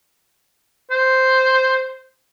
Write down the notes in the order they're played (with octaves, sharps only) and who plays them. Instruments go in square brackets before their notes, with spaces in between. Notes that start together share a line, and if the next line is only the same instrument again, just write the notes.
[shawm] C5